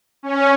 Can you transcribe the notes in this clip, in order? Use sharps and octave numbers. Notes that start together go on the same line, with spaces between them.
C#4